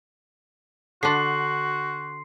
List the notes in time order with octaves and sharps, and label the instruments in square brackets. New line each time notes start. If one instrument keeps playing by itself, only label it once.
[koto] D3 D4 [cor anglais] F#4 [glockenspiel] C6 C7